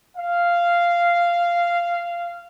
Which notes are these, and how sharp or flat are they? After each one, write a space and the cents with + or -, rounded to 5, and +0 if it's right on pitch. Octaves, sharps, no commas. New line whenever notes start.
F5 -10